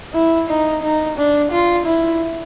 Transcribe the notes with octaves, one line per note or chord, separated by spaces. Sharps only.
E4
D#4
D#4
D4
F4
E4